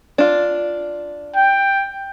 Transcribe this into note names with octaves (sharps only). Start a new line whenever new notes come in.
D4 F4
G5